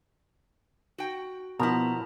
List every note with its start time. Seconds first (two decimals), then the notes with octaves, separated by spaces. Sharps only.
0.98 F#4 G5
1.59 B2 F3 B3 E4 A#4 A#5